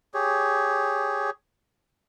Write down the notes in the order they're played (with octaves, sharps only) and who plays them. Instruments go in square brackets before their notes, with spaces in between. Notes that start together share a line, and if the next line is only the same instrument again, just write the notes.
[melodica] G4 G#4 C#5